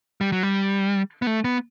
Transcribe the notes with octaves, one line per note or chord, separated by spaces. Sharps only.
G3
F#3
G3
B3
A3
B3